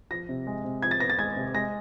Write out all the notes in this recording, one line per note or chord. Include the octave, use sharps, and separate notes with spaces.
F3 A#6
C3
G#3
C3
F3 G#6
A6
B3 A#6
A6
G#3 G#6
C3
G#3 A#6